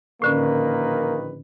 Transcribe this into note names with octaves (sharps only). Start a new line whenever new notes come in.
A#1 A2 D3 D#3 A#3 C#4 B4